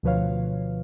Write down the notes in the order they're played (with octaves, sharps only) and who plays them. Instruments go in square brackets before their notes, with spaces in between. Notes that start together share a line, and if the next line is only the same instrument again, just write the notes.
[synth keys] D2 B2 F3 B4 C#5 F5